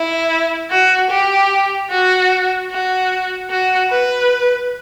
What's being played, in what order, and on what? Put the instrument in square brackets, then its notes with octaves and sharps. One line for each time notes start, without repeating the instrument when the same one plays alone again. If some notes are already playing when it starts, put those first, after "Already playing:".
Already playing: [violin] E4
F#4
G4
F#4
F#4
F#4
B4